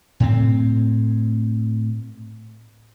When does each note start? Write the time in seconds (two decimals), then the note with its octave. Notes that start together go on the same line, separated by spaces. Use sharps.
0.20 A2 C4